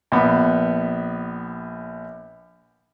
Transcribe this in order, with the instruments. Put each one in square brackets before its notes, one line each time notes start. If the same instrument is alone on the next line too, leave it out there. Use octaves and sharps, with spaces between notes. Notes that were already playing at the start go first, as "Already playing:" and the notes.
[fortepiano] A#1 B3